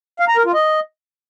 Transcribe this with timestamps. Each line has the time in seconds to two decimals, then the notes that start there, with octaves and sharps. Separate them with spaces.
0.20 F5
0.28 A#5
0.37 A#4
0.45 F4
0.54 D#5